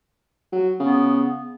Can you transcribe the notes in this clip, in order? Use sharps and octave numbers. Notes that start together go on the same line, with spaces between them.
F#3
C#3 B3